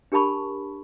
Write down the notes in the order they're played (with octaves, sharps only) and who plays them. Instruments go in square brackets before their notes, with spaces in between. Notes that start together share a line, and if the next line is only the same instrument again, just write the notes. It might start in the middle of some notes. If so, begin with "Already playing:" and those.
[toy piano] D4 G4 A#4 A5 B5 C#6